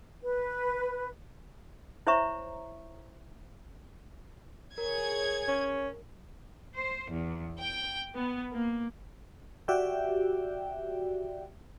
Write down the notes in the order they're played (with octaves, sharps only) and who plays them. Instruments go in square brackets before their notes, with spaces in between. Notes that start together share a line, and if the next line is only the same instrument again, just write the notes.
[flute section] B4
[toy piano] E4 C5 C#5 E5 A#5 C#6
[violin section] G#4 C#5 G#6 [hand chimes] A#4
[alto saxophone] C#4
[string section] C5
E2
G5
B3
A#3
[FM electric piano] F#4 G4 D5 E5 G5